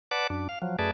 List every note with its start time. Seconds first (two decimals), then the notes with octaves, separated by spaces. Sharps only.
0.11 B4 D5 F#5 A5 D6
0.30 F#2 D4
0.49 F5
0.62 F3 F#3
0.79 F#2 A3 G#4 B4 D5 A5